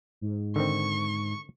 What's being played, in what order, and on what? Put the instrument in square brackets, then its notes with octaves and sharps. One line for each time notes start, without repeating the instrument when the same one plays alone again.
[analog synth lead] G#2
[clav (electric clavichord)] D3 D#3 C4 [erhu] C#6